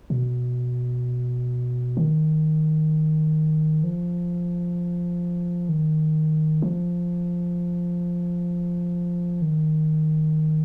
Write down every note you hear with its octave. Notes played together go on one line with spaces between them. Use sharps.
B2
D#3
F3
D#3
F3
D#3